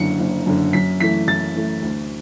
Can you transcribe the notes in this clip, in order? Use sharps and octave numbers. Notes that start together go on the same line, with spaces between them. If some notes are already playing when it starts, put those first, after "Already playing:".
Already playing: F#1 F#2 D3 C#7
F#1
F#2 D3
F#2 B6
E3 A3 B6
F#2 A6
E3 A3
D2